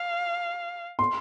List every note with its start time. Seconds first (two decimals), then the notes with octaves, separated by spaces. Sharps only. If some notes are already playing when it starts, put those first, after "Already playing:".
Already playing: F5
0.99 C6